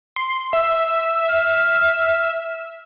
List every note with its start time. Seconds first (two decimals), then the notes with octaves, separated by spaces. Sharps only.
0.16 C6
0.53 E5 E6
1.28 F6